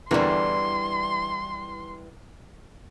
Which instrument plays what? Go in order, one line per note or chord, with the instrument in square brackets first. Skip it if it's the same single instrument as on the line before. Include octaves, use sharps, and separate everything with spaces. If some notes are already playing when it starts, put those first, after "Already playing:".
[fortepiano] E2 D3 A#4 [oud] E3 G3 [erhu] C6